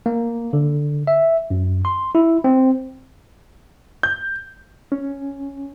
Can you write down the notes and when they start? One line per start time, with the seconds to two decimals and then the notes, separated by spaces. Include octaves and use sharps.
0.06 A#3
0.53 D3
1.07 E5
1.50 F#2
1.85 C6
2.15 E4
2.44 C4
4.03 G6
4.92 C#4